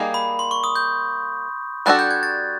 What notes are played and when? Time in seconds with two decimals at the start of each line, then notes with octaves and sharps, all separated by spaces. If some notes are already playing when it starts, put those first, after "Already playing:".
Already playing: G3 A#3 D#4 G#4
0.14 B5
0.39 C6
0.51 C#6
0.64 D#6
0.76 G6
1.86 G3 B3 D4 F#4 A4 F#6
1.99 G6
2.11 G#6
2.23 A6